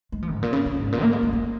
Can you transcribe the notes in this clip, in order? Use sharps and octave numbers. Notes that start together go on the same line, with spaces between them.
G#3
F3
G#2
A#2
C#3
C#3
G#2
A#2
A#3
G#3
G#3
A#3